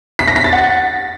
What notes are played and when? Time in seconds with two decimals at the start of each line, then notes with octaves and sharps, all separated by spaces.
0.19 B6
0.28 A#6
0.36 B6
0.44 A6
0.53 F#5